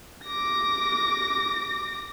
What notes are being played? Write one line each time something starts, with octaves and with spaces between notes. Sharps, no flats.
D6 A#6